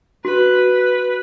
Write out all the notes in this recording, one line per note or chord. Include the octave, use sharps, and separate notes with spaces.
F#4 B4